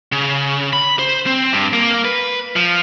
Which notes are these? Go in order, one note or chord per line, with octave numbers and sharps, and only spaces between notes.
C#3
B5
C5
C4
G2
A#3
B4
F3